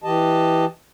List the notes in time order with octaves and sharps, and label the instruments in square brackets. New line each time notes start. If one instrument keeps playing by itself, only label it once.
[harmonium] E3 G4 D#5 A5